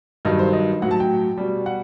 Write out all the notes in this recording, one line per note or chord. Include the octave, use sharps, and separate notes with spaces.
G2 D#3 F#3 D#5
C5
D#5
A2 F#3 F#5
A5
G5
B2 G3
F#5